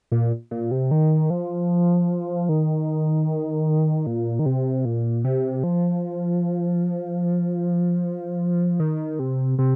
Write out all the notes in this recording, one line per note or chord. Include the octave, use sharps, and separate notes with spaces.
A#2
A#2
C3
D#3
F3
D#3
A#2
D#3
C3
A#2
C3
F3
D#3
C3
C3